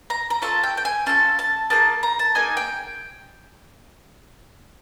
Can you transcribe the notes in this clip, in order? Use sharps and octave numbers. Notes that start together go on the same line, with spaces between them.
A#5
A#5
C#4 F4 A4 A5
G5
G5
G#5
C#4 F4 A4 A5
A5
A#3 D#4 G#4 A5
A#5
A5
A#3 D#4 G#4 G#5
G5